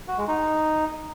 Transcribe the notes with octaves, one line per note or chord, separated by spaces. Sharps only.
F#4
G#3
D#4